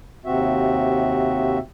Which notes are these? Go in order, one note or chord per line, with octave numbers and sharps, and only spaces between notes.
D#2 C3 C4 F#4 E5